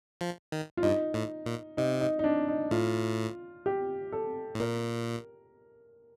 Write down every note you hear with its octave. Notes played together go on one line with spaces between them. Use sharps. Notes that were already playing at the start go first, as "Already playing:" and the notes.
F3
D#3
F4
G2 D#4
A2
A#2
C3 D#4
D#4
D#4
D4
D#4
A2 F4
G4
A4
A2
A#2 A#4